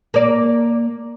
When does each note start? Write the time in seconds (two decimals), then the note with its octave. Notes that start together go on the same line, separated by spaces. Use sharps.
0.14 A#3 D5